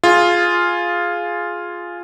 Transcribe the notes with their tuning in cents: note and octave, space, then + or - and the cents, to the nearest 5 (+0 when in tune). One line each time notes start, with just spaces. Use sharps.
F4 +0 G#4 +5